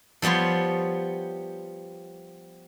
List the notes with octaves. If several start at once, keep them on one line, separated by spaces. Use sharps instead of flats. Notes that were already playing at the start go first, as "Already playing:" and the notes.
F3 G3 B3 C#5 C6